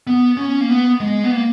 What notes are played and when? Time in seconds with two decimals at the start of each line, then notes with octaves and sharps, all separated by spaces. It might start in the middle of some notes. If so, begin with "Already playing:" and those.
0.07 B3
0.37 C#4
0.61 A#3
0.69 B3
1.00 G#3
1.24 B3
1.31 A#3